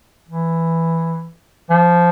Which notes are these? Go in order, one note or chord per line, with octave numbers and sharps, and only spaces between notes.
E3
F3